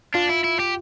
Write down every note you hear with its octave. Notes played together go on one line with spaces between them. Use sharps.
D4 F4
E4
E4
G4